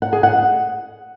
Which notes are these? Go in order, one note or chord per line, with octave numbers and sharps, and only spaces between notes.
F#5
G#4
F#5